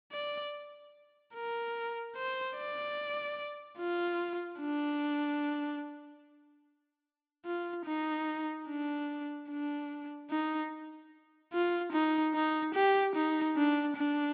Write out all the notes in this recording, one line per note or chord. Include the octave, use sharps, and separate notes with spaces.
D5
A#4
C5
D5
F4
D4
F4
D#4
D4
D4
D#4
F4
D#4
D#4
G4
D#4
D4
D4